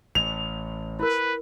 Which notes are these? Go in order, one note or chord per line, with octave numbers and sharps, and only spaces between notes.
A1 F7
E4 A#4 B4